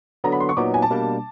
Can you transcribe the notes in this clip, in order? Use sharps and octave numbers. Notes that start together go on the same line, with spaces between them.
D3 F#3 B3 A#5
B5
C6
C#6
A#2 F#3 B3 D#4 D6
G#5
A5
B2 G3 A#3 D4